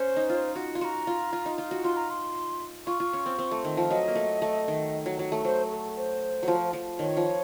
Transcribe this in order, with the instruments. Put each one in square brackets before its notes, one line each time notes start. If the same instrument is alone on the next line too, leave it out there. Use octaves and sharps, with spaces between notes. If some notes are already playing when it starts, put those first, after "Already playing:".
Already playing: [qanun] C#4 [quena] C5
[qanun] D#4
F4
F#4
F4
[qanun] F#4 [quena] A#5 C6
[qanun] F4
F4
D#4
F4
F#4
[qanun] F4 [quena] C6
[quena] A#5
C6
[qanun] F4 [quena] C#6
[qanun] F4
C#4
C4
C4
A3
D#3
F3
[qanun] F#3 [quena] D#5
[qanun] A#3
A3
A3
D#3
F#3
F#3
A3
[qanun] F#3 [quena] C5
[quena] A4
C5
[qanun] F3 F#3
F3
[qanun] D#3 [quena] C#5
[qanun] F3